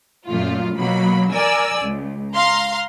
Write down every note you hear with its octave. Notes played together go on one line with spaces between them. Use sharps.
F#2 A#2 A3 F4
B2 F#3 A#3 B5
A#4 D5 G#5 E6
C#2
F5 A#5 C6